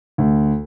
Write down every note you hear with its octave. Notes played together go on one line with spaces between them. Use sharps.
D2